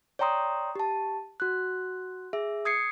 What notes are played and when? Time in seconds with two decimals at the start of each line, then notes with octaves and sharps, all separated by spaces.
0.19 C#5 D5 G5 A#5 C6 D#6
0.75 G4 A5
1.40 F#4 F#6
2.33 G#4 E5
2.65 D#6 G#6 C7 C#7